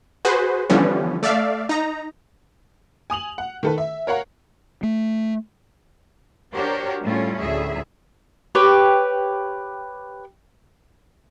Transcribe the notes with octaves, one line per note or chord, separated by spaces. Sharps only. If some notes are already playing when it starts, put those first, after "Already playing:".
F#4 G#4 B4 C5
D3 E3 F3 G3 B3 C#4
A3 D5 E5 F5
D#4 A#5
G#5 D#6 F7 F#7
F#5
D#3 A4 B4
E5
A#4 C#5 F5 F#5 A#5
A3
D4 F#4 G4 A#4 C5 C#5
A2 G3 A3 C#4 F4
D2 A2 G#4 E5
G4 B4 C#5